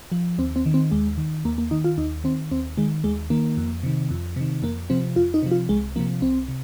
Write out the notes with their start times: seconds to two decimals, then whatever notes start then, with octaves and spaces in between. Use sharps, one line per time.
0.12 F3
0.38 D#2 C4
0.56 C4
0.66 D#3
0.74 C4
0.91 D#2 G#3
1.18 D#3
1.45 D#2 A#3
1.58 A#3
1.71 D#3 D#4
1.84 F4
1.98 D#2 D#4
2.24 D#3 C4
2.51 D#2 C4
2.77 D#3 G#3
3.04 D#2 G#3
3.30 D#3 A#3
3.57 F2
3.83 C3 D#3
4.11 F2
4.36 C3 D#3
4.62 F2 A#3
4.90 C3 F3 C4
5.16 F2 F4
5.34 D#4
5.43 C3 F3
5.51 F4
5.69 C2 G#3
5.96 C3 F3 A#3
6.22 C2 C4
6.48 C3